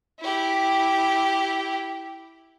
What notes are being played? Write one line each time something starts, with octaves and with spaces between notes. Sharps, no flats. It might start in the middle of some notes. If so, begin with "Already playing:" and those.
E4 G4